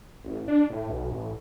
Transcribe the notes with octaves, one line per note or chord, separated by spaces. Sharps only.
A1
D4
A2
B1
A1